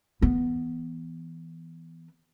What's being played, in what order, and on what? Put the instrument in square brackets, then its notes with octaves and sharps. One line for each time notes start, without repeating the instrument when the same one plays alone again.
[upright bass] E3 B3